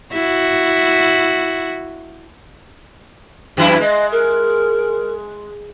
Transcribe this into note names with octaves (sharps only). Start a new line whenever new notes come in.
E4 F#4
F#2 E3 E4
G#3 D#5
A#4